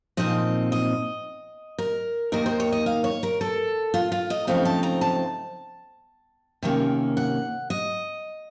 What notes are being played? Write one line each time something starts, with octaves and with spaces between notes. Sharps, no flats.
A#2 F3 C4 D#4 D#5
D#5
A#4
D#2 D#3 A#3 D#4 A#4
C5
C#5
D#5
F5
C#5
A#4
A4
F4
F4
D#5
C#3 F3 A3 C4 D#4 F5
A5
A#5
A5
C3 D#3 A#3 C#4
F#5
D#5